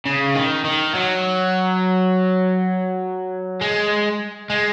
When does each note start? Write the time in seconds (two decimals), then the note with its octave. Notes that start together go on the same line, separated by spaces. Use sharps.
0.06 C#3
0.35 D#3
0.65 D#3
0.95 F#3
3.61 G#3
4.50 G#3